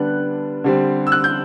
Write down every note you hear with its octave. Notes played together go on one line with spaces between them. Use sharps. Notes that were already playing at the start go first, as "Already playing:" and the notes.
Already playing: D3 G3 B3 D4 F#6
D3 G3 C4
E6
F#6
G6